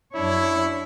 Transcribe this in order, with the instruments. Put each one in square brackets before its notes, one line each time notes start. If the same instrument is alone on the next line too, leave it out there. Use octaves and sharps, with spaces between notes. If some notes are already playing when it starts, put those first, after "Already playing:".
[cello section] F#2 D4 C#5 [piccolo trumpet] E4